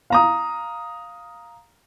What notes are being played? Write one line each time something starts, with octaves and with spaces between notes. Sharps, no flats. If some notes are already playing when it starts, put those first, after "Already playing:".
F5 A#5 D#6